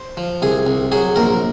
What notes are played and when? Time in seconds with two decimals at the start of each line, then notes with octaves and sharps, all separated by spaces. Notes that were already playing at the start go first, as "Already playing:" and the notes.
Already playing: C5
0.17 F3
0.42 C2 G#4
0.66 C2
0.92 F#3 G#4
1.16 A#1 A#4